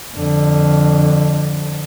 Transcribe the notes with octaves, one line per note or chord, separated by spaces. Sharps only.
F2 D3